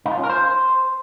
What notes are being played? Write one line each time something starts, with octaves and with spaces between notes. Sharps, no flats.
D#4
F4
C#4
A#4
C5